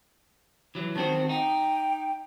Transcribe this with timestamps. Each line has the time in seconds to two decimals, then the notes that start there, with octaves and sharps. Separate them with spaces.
0.75 E3 F#3
0.96 D#3 C4 F#4 A5
1.29 D#4 G5